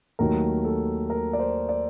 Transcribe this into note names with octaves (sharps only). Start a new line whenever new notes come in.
D#2 D#3 F#3 A3 A#4
A4
A#4
D5
C5
D5